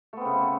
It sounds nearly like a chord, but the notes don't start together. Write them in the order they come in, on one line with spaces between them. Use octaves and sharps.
A3 B3 C4 C#3